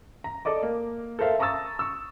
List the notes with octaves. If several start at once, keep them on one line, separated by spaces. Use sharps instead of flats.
A#5
A4 D5 D#5 D6
A#3
A4 A#4 C5 E5 F5
A5 A#5 C#6 D#6 E6 A6
C#6 E6